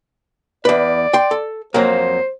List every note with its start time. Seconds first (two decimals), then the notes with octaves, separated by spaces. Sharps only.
0.65 E2 B4 D5
1.13 G5 C6
1.31 A4
1.74 F2 F#3 A#3 C5